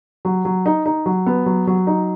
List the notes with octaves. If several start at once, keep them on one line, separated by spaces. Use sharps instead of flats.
F#3
F#3
D#4
D#4
F#3
B3
F#3
F#3
D#4